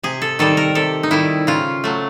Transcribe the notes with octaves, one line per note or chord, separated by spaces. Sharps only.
C3 G#4
A4
D#3 G3 A4
A#4
C3 A4
D#4
D#3 G3 E4
C#3 F4
F#3 A3